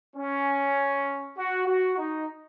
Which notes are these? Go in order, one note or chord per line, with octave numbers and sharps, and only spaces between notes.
C#4
F#4
F#4
D#4